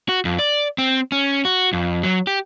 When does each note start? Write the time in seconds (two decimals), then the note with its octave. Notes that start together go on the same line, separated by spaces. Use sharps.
0.09 F#4
0.25 F2
0.39 D5
0.78 C4
1.12 C#4
1.45 F#4
1.73 F2
2.03 F#3
2.27 G4